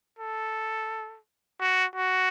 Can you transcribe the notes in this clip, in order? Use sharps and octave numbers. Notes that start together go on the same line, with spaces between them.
A4
F#4
F#4